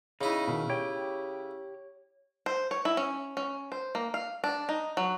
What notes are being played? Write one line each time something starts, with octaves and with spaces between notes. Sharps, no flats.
C#3 D#4 E4
B2 D#3
G4 C#5 G5
C5
C#5
E4
C#4
C#4
C5
A#3
F5
D4
D#4
F#3